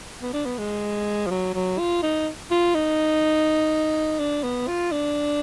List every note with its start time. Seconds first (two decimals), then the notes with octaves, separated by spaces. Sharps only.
0.22 B3
0.33 D4
0.46 B3
0.58 G#3
1.26 F3
1.30 F#3
1.54 F#3
1.79 F4
2.03 D#4
2.51 F4
2.75 D#4
4.19 D4
4.43 B3
4.68 F4
4.92 D4